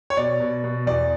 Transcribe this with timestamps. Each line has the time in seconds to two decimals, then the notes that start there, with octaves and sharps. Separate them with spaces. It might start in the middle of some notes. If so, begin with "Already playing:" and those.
0.10 C#5
0.17 B2 D5
0.40 B2
0.64 B2
0.86 E2 D5